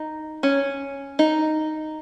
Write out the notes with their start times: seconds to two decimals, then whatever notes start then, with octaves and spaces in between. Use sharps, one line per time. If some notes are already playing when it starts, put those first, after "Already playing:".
Already playing: D#4
0.43 C#4
1.19 D#4